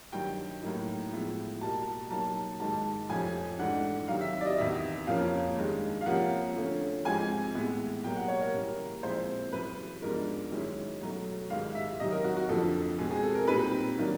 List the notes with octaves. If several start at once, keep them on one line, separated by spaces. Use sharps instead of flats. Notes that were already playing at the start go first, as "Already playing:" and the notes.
G2 D#3 F#3 G5
A2 F#3 A#3 D#4
A2 F3 G#3 B3 E4
B2 G3 A#3 A5
B2 F#3 A#3 D#4 A5
G#2 D#3 G#3 A5
F2 C3 F3 A3 C#4 G#5
G#2 E3 A3 D4 F#5
C3 D#3 F#3 F5
E5
E5
D5
D#5
E2 C3 D#3 E5
F2 C#3 F3 A#3 C#4 F5
G2 D#3 G#3
F5
C3 F3 A#3 C#4 F#5
D3 F3 A3 C#4
G#2 F3 G#3 C4 G#5
A2 E3 G#3 B3 E4
B2 F#3 A#3 G5
F#5
C#5
A#4
C#3 E3 G3 A#3
A#2 F3 G#3 C4 E4 C5
F#2 C#3 E3 B4
G#2 F3 G#3 B3 D4 A#4
F#2 D#3 G#3 C#4 E4
B2 F#3 A3
G#2 D#3 G#3 F5
E5
C3 D#3 F#3 D#5
A#4
F#4
F#4
F2 D3 F3 A4
B2 G#3 C4 G#4
G#4
A4
A#4
A#2 G3 C4 D#4 B4
D#3 F#3 A#3 D4